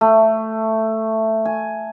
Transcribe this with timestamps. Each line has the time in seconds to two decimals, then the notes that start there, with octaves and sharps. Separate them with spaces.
0.01 A3
1.45 G#5